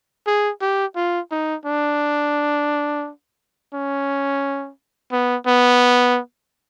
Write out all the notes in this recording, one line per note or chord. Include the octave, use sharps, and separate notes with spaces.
G#4
G4
F4
D#4
D4
C#4
B3
B3